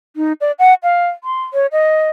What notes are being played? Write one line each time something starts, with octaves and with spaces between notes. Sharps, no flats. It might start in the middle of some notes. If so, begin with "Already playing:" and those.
D#4
D5
F#5
F5
C6
C#5
D#5